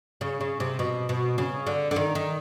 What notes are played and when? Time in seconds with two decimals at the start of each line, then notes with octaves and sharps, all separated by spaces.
0.21 C#3
0.41 C#3
0.60 C3
0.79 B2
1.09 B2
1.38 C#3
1.67 D3
1.91 D3
1.96 D#3
2.15 D#3